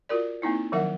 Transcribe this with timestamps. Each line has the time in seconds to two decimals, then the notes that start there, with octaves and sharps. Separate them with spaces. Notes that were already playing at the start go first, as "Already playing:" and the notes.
0.09 F4 F#4 A#4 D5
0.42 A#3 C4 D#4 E4
0.72 D#3 F3 F#3 A#4 E5 F#5